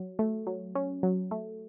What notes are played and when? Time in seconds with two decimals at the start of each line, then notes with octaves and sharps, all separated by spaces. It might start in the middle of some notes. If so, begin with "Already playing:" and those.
Already playing: F#3
0.19 A3
0.47 F#3
0.75 C#4
1.03 F#3
1.31 A3